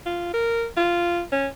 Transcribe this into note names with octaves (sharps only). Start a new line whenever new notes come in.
F4
A#4
F4
C#4